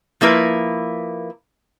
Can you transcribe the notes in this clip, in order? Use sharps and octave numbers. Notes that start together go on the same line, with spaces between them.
F3 A#3 E4 B4